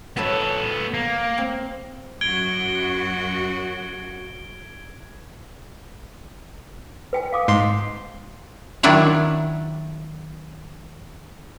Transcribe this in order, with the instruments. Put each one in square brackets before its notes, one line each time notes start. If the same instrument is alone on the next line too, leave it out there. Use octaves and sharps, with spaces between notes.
[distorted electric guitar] B3 A4 [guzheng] F#4 B4 C#5
[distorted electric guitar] A#3
[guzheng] C4
[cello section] F#2 F#4 [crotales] G#6 D7 G7
[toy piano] B4 G5 G#5
F5 D6 D#6
[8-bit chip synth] G#2 C6
[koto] D#3 F#3 D4 E4 C#5